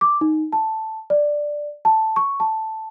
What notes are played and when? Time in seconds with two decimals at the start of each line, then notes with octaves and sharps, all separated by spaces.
0.01 D6
0.21 D#4
0.52 A5
1.10 D5
1.85 A5
2.16 C#6
2.40 A5